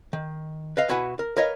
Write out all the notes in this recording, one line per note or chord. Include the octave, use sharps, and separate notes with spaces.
D#3
B4 D#5 F5
B2 E4 F#4 B4 F#5 G#5
A#4
A#4 B4 C#5 D#5 F5